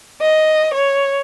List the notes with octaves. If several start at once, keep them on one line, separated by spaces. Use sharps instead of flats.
D#5
C#5